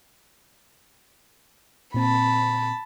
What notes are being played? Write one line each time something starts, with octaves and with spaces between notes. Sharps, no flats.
A#2 C4 A5 B5